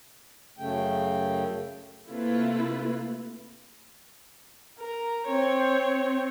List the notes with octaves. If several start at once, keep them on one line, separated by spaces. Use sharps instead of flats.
F#2 C#3 A3 G5
C3 A3 A#3 E4 F4 B4
A#4
C4 C#5